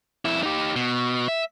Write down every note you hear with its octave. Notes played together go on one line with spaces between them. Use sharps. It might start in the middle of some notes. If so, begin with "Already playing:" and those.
F2 E4
D#4 G4
B2
E5